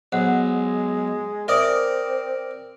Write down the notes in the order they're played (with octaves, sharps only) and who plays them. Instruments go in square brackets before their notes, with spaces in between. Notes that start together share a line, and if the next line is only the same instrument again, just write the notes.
[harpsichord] B1 [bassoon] G#3 [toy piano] C5 F#5
[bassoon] C4 [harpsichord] A#4 D5 [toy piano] E5 D#6